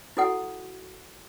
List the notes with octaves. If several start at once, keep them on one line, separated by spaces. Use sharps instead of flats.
E4 F#4 A4 F#5